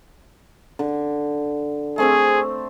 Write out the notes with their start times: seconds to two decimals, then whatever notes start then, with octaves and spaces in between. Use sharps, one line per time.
0.79 D3
1.98 A3 C4 G#4 C5